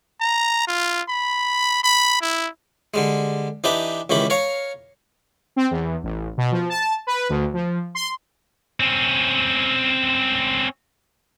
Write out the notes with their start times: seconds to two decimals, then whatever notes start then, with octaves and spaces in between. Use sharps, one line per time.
0.21 A#5
0.67 F4
1.09 B5
1.84 B5
2.21 E4
2.94 D3 G3 G#3
3.64 E3 D4 D#4 G4 B4
4.10 C#2 D#3 E3 G4 B5
4.30 A#4 C#5 F5 C#6
5.56 C4
5.71 E2
6.03 A1
6.38 B2
6.52 F3
6.69 A5
7.07 B4
7.29 D2
7.54 F3
7.95 C6
8.80 C4 C#4